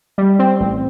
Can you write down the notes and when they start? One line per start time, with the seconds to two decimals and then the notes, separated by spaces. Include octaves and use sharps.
0.18 G3
0.39 C4
0.60 A1